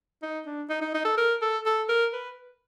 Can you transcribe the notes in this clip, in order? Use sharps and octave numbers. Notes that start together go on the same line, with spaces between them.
D#4
D4
D#4
D#4
D#4
A4
A#4
A4
A4
A#4
B4